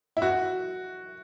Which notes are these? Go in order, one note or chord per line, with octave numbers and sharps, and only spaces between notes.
E4
F#4